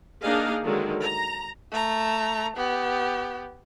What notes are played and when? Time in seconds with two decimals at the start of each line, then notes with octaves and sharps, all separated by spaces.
0.23 A#3 D4 D#4 G#4 D#5 F5
0.63 D3 D#3 F#3 G#3
1.01 A#5
1.72 A3 A#5
2.57 B3 G4